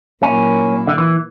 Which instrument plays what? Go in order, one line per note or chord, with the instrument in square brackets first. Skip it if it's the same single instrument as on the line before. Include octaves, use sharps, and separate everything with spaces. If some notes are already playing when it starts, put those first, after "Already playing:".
[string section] A#2 F#3 A#3 E4 [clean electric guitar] C#4
[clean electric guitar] D3
E3